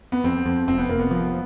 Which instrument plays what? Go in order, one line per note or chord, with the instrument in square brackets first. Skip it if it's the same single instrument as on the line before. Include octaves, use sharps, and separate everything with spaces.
[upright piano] B3
[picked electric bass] F2 [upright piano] C4
[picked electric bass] F2
[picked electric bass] F1 [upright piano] C4
[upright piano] B3
[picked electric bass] F1 [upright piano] A#3
[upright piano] B3
[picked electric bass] F3